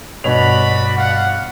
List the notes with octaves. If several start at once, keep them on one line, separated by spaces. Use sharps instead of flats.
G2 B2 F#4 C#5 D5 B5 F7
F5 F#5